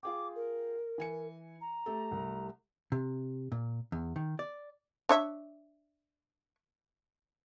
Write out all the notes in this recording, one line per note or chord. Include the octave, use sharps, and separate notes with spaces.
F4 G#4 G5 D6
A#4
E3 G#5 C#7
A#5
A3 G4 A4
C2 G3 A3
C3
A#2
E2
D#3
D5
D4 C#5 E5